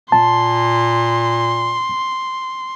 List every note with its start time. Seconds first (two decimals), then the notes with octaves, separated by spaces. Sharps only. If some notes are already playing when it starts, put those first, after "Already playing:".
0.12 A#2 A5 C6